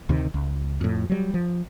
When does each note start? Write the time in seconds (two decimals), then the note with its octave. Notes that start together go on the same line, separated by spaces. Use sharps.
0.09 D2 C3 D#3
0.34 C#2
0.81 F2 A2
1.10 F#3 G3
1.34 F3